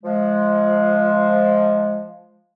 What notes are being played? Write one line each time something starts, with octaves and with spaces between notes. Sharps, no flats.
F3 G#3